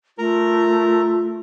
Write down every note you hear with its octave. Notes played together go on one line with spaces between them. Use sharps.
A3 F4 A#4